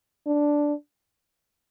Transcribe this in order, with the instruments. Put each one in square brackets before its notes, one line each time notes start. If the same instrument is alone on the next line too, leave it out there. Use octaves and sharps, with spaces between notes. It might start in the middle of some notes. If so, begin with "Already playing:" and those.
[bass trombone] D4